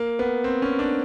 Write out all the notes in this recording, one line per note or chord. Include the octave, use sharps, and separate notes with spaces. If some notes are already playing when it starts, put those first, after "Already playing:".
Already playing: A#3
B3
C4
C#4
D4